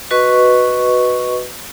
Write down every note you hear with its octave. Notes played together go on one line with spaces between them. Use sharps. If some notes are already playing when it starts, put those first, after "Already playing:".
F#4 B4 D#5 C#6